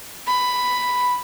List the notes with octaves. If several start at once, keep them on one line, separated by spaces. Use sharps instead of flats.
B5